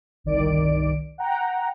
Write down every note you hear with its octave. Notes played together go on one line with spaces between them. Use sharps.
G1 C2 D#3 D5 D7
F#5 G5 A#5